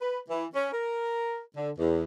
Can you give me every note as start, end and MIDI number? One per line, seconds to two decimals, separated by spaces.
0.01 0.19 71
0.30 0.45 52
0.55 0.69 61
0.73 1.39 70
1.56 1.70 50
1.78 2.04 40